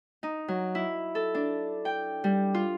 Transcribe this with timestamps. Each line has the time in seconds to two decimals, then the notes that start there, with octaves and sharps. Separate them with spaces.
0.23 D#4
0.48 F#3
0.75 E4
1.15 A4
1.35 D4
1.85 G5
2.24 G3
2.54 F4